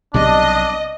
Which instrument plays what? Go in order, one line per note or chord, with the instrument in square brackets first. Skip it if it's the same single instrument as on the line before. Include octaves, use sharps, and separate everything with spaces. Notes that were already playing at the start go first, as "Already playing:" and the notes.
[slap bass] B1 C3 G3 [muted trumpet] D4 [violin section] D#5